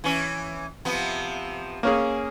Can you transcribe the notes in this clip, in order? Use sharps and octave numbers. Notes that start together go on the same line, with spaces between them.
E3 C#4
C3 F3 B3
A#3 C#4 G#4